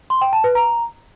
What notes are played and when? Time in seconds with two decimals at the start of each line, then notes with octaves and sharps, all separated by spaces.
0.10 C6
0.21 G5
0.33 A5
0.44 B4
0.55 A#5